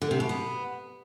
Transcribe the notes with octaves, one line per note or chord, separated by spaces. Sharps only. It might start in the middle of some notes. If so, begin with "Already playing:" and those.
D3
C3
B2
B3